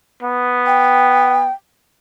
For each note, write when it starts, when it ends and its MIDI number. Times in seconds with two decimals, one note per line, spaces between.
0.23 1.47 59
0.66 1.52 79